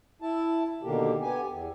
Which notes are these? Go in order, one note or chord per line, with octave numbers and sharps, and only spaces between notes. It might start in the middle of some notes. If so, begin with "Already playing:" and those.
E4 A5
B2 D3 D#3 A#3 G4
B3 G4 G#5
E2